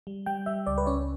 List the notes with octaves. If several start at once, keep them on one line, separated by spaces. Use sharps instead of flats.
G3
G3 G5
G3 E5
C#2 D5
B4
C#4 C#5